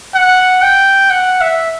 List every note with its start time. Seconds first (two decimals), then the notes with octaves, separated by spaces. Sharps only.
0.15 F#5
0.62 G5
1.10 F#5
1.41 E5